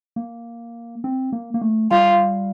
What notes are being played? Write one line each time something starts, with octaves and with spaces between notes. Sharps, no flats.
A#3
C4
A#3
A#3
A3
G3 F4